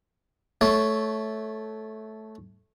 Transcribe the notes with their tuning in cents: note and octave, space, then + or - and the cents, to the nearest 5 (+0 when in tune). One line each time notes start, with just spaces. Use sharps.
A3 -10 C#5 +0